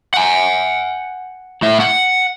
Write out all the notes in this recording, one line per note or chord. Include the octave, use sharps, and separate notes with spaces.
F#5 G#5
A2 E5
F#5